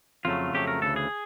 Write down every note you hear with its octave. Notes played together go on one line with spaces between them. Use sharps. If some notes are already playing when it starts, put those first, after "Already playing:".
F2 C#3 F#3 A3 F4
F2 C#3 F#3 A3 G4
A#4
D2 C#3 E3 A4
G#4